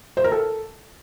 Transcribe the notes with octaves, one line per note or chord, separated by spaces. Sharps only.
C5
A#4
A4